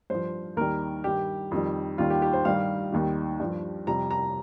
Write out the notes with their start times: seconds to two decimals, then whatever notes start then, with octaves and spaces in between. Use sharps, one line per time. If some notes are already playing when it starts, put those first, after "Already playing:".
0.10 G2 F3 C5
0.57 D#2 D#3 G3 A#4
1.04 G2 D#3 G3 G4
1.51 F2 D#3 G3
1.98 D#2 D#3 G3 F4
2.10 G4
2.22 G4
2.33 C5
2.45 G2 D#3 G3 F5
2.92 D#2 D#3 G3
3.40 G2 F3
3.87 F2 C3 G3 A#5
4.10 A#5